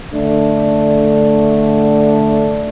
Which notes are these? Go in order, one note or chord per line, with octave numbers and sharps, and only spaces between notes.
D3 A3 D4